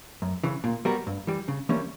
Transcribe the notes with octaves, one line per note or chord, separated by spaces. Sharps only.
F#2
C#3 E3
A#2
G3 B3 F#4 A#4
G2
E3 G3
C#3
E3 G3 A#3 C#4